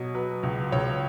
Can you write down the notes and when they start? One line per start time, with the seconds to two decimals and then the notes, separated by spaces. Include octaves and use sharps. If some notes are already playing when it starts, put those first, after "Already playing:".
Already playing: B2 F#3 C#5 D#5
0.15 F#3 B4
0.43 C#2
0.72 C#2 C#5